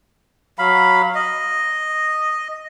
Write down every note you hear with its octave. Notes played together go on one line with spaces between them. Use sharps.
F#3 F5 B5
D#5